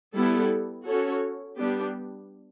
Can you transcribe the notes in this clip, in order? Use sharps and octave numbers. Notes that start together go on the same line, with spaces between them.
G3 B3 E4 A4
C#4 F#4 A4 C#5
G3 B3 D4 G4